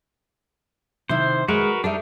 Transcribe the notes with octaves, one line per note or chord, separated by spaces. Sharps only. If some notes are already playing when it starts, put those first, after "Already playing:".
C3 D#3 E4 C5
G#3 F#4 G#4 A#4 B4
G3 D4 D#4 A4 E5